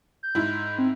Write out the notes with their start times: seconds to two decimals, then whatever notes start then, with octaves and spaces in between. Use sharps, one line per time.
0.23 G6
0.35 G#2 E4
0.64 G6
0.79 C4